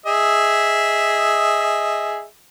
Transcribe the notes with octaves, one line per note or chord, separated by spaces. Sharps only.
G#4 D#5 E5